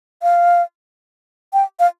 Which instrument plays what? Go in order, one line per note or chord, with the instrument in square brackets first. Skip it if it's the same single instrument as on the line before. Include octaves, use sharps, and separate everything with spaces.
[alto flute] F5
G5
F5